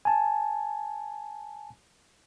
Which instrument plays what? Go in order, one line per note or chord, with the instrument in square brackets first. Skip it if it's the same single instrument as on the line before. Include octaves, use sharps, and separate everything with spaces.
[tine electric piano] G#5 A5